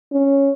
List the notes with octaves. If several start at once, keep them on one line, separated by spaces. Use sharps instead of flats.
C#4